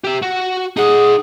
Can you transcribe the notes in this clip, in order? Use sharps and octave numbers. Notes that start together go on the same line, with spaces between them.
G4 E5
F#4
D#4 G#4 F#5